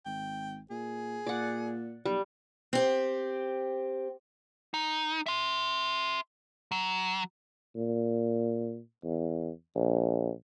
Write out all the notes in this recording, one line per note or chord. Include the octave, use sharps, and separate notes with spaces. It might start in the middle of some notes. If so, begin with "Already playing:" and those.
G#1 G5
A#2 G#4
A#2 D5 F#5
B1 G3
C4 G4
D#4
E5 C6
F#3
A#2
E2
A#1